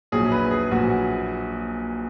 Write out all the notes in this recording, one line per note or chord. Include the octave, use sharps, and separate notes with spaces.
A#1 A#2 F#3 G#4
B4
G#4
A#1 A#2 F#3 F#4